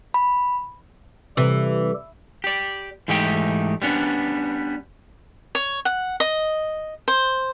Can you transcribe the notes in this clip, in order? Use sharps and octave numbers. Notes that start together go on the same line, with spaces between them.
B5
C3 E3 G3 G4 A4
G4 D5
G#2 E3 A3 D#4 G4 G5
G3 B3 C#4 D4
C#5
F#5
D#5
C5